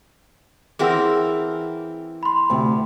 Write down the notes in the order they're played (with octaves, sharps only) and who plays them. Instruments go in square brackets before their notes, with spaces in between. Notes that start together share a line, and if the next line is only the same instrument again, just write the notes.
[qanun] E3 C4 A#4 [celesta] G#4 F#5 E6
[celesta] B5 C6
[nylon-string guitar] D2 C3